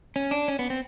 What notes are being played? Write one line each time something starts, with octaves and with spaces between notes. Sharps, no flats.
C#4
D4
C#4
B3
C4